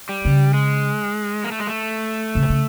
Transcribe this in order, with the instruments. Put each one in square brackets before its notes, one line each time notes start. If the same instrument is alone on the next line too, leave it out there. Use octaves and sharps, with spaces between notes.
[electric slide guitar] G3
[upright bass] C#3
[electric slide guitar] G#3
A#3
A3
G#3
A3
[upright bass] C#3
C3
C#3